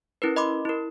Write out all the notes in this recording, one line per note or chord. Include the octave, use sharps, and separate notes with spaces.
C#4 E4 A#4 B4
D#5 B5 C6 D6
E4 A#4